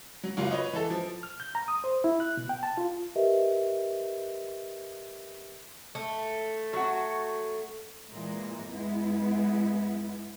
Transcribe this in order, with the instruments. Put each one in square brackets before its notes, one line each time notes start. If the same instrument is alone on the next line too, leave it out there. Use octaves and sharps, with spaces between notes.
[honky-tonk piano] F#3
F#1 F#3 F4
B4 C#5 D#5
E3 A4
F3
[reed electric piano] F6
G6
A#5
D#6
C5
E4
F#6
B2
G5
A5
F4
[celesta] G4 A#4 B4 D#5 E5
[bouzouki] A3
[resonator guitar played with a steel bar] F#3 F#4
[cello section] A#2 E3 G#3 A#3
F#2 G#3 B3 E4